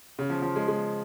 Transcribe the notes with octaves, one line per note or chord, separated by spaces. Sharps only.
C#3
F3
F3
G#3
G#3